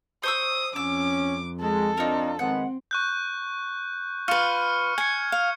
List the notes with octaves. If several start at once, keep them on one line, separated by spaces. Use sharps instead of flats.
C5 C#6 D#6 E6
F2 C#4 D6 E6
G#3 A4
C4 D4 D#4 F4 A#4
D#3 G#3 B3 C4 F#5
C#6 F#6 G6
F4 B4 C#6 F6 C#7
G#5 G#6 C#7
F5